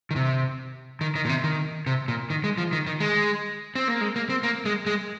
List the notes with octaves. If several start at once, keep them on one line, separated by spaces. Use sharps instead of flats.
D#3
C3
D#3
D#3
A#2
C3
D#3
C3
A#2
D#3
G#3
F3
D#3
D#3
G#3
C4
A#3
G#3
A#3
C4
A#3
G#3
G#3